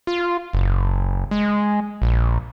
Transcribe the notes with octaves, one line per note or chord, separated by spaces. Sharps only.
F4
F#1
G#3
A#1